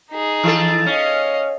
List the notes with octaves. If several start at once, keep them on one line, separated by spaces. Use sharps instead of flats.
D#4 G#4
E3 A4
C#4 D#5 F5